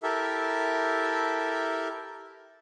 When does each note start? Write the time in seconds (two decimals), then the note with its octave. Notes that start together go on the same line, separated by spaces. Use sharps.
0.03 E4 G4 A4 A#4 E5